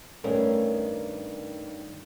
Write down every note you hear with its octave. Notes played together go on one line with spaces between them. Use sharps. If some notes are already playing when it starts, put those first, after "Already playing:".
G2 D#3 A3 C#4 A#4